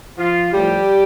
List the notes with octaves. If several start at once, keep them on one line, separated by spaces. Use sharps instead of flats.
F3 F4
A2 F3 G3 G4